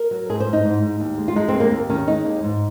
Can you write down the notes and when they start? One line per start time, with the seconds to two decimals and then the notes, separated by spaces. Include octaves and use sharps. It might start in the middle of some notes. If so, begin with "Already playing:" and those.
Already playing: A#4
0.11 F#3
0.29 G#2 G#4
0.40 C5
0.46 G#2
0.53 D#4
0.65 G#2
0.82 G#2
1.00 D#2
1.18 G#3
1.28 F4
1.36 G#3 D#4
1.49 C4
1.54 D#2
1.60 A#3
1.72 D#2
1.90 D#3 C#4
2.07 G#3 D#4
2.25 D#2
2.44 G#2